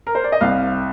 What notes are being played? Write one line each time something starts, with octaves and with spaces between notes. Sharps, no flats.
A#4
C5
D5
D#5
C2 F5